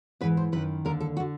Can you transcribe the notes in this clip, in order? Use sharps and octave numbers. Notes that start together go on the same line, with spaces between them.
G#2 E3 B4
C5
F#2 D#3 B4
D#2 D3 A#4
A4
F#4
D3